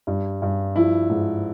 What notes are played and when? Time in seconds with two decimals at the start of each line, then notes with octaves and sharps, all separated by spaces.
0.07 G2
0.42 G2
0.75 F3 E4
1.10 G#2